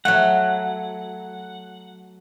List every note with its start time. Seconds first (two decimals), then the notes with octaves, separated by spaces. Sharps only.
0.05 F#3 A3 F#5